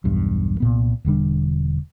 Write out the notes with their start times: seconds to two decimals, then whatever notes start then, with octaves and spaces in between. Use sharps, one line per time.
0.04 B1 E2 G2
0.60 C2 A#2 B3
1.05 E1 D3 G3 D4